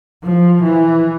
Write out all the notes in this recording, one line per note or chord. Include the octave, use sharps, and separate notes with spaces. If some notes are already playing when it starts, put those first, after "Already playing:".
F3
E3